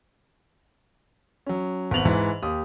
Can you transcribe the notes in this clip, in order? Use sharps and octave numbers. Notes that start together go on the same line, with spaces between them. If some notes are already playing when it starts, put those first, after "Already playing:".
F#3 C#4
G#1 B3 F7 F#7
G#2 E3
D#2 G4 D#6